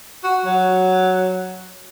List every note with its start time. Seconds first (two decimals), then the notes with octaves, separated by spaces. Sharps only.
0.24 F#4
0.45 F#3